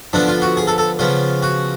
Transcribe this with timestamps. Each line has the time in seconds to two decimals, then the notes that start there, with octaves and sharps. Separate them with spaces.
0.13 D3 F3 B3 D4
0.28 F4
0.42 F#4
0.57 G#4
0.67 A4
0.78 A4
0.99 C#3 F3 B3 F4
1.43 F#4